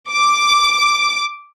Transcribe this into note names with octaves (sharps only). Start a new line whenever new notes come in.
D6